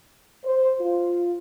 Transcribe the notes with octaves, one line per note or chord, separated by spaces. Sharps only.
C5
F4